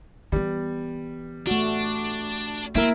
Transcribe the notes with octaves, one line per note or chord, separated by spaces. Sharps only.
E3 G3 B3
A3 D4 F#4
A#3 C4 E4 A#4